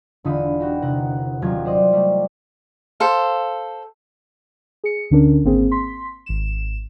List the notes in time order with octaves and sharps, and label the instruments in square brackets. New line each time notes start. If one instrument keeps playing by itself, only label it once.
[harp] E1 D3 D#4 F4 B5 D#6
F#4 G4
C3 A#4 F#5
D#1 F#3 F4 G4 G#6
G4 C5 D5 D#5
G3 A3
[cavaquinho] A4 C5 F5
[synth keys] G#4 C#7
D2 D3 C#4 D4 A#4
G#1 A#3 C4 G#4
C6 B6
G#1 E7